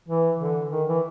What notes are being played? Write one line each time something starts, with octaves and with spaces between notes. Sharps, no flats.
E3
D3
D#3
E3